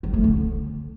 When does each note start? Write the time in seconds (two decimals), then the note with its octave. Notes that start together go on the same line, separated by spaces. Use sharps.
0.03 F3
0.14 A3
0.24 D3